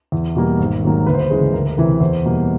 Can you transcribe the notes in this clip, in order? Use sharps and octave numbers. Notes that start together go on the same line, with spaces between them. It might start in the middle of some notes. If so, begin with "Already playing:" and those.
E2
B2 G3 A#3
G#1
G#2 D#3 F#3 A#3
D2 B4
C5
B4
C#3 E3 G#3
D2 A#4
A#4
C3 E3 B4
E2 C5
B2 G3 A#3